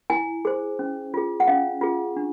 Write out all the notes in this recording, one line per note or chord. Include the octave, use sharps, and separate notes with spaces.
E4 G#5
G#4 C5
C#4
F4 G#4
F#5
C#4 F5
F4 G#4
D4